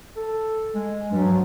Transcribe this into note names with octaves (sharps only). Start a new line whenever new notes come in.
A4
G#3
G2 F#3
F3